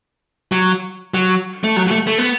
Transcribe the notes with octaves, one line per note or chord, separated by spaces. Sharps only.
F#3
F#3
A3
F#3
F#3
A3
A3
B3